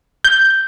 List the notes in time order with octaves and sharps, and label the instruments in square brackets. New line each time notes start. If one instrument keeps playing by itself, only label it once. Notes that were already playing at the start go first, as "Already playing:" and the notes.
[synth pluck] G6